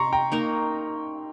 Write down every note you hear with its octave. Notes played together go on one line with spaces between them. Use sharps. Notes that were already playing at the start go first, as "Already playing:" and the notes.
Already playing: C3 A#5 C6 C#6
G5 A#5
A#3 D#4 A#4